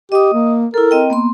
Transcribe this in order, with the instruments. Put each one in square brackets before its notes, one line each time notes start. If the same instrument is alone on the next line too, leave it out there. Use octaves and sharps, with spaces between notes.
[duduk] G4 [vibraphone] D#5 D#6
[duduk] A#3
[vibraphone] E4 A4 [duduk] A#4
[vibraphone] C4 D#5 G5
A#3 B3 C6